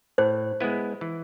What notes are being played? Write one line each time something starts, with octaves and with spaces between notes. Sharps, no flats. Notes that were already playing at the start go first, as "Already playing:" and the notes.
A2 C5
G#3 B3 E4 B4
E3